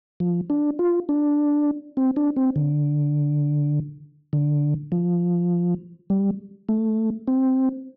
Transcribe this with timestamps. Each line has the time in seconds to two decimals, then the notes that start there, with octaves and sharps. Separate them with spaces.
0.20 F3
0.50 D4
0.79 F4
1.09 D4
1.97 C4
2.16 D4
2.36 C4
2.56 D3
4.33 D3
4.92 F3
6.10 G3
6.69 A3
7.28 C4